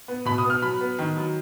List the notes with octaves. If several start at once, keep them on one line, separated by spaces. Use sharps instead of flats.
B3
B2 B5
D#6
B3
F6
F#3 B5
B3
D#3
F#3